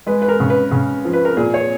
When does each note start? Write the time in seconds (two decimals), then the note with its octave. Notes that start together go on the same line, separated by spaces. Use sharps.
0.06 G#3 B4
0.22 B4
0.28 A#4
0.40 C#3
0.50 B4
0.71 C#3
1.05 F3
1.13 B4
1.25 A#4
1.37 A#2 G#4
1.54 C#5